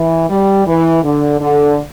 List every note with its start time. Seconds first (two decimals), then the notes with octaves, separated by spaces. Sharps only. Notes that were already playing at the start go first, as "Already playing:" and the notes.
Already playing: E3
0.30 G3
0.66 E3
1.03 D3
1.40 D3